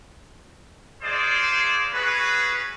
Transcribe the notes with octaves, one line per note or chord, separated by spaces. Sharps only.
D#4 F4 G#4 C5 D5
C#4 F#4 G#4 B4